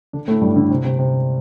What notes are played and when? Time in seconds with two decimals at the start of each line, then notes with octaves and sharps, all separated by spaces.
0.13 D3 D4
0.28 A2 A3
0.41 G2 G3
0.56 D3
0.70 C3
0.84 C3
0.99 C3